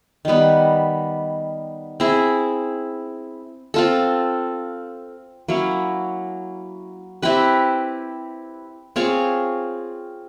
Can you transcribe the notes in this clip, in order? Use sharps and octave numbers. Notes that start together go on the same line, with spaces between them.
D#3 G3 B3
C4 E4 G#4
C4 F4 A4
F#3 A#3 C#4 E4
C4 E4 G4 B4
C4 F4 G#4 C#5